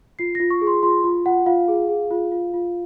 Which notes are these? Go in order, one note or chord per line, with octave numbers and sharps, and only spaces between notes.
F4 C7
F4 A#6
C#6
G#4
C6
F4 C6
F4
F4 F#5
F4 F5
G#4
G#4
F4
F4
F4